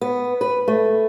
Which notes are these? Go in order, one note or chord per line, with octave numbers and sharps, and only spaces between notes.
B3
B4
A3